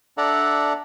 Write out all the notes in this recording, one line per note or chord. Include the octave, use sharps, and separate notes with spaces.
D4 A4 D5 E5 F#5 A#5